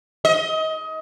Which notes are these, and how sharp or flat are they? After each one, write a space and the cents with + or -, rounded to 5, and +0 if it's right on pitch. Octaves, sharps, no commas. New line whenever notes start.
D#5 +25